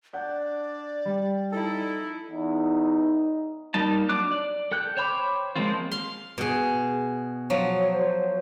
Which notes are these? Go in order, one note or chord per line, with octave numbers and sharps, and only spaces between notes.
D4 D5 F#5 G6
G3
D#4 E4 A4
E2 D#4
G3 A#3 D#4 A5
F#3 D4 D6 F#6
D5
A4 G5 F#6 G6
C5 C#5 G5 B5 D6
F3 G#3 A#3 C4 F4
F5 C6
B2 G#4
F3 F#3
C5